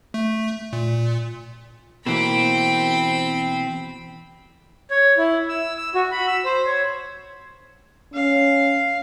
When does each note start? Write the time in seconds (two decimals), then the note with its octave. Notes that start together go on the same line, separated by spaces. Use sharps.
0.14 A3
0.73 A#2
2.06 B2 E3 A#3 C4 G5 B5
4.91 C#5
5.18 E4
5.49 E6
5.77 E6
5.95 F#4
6.11 B5
6.27 E6
6.45 C5
6.66 C#5
8.14 C#4 F5